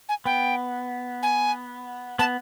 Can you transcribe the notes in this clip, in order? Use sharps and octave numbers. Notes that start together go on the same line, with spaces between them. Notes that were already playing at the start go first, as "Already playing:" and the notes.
G#5
B3 G5
G#5
B3 A5